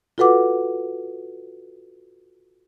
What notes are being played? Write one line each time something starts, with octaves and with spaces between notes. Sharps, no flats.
F4 F#4 A4 B4 F#5 D6